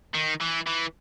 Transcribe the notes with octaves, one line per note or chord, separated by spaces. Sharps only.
D#3
E3
E3